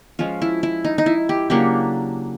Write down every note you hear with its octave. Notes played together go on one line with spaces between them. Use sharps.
F3 G#3 C#4 F4
E4
E4
D#4
D#4
E4
G4
C#3 F#3 A#3 D4 G4